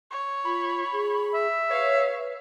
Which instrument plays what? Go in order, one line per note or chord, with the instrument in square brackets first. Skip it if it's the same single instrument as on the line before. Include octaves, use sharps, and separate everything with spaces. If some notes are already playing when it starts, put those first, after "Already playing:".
[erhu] C#5
[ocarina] F4 [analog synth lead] B5
[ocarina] G#4
[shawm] E5
[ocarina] B4 [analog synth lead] C#5 [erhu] F5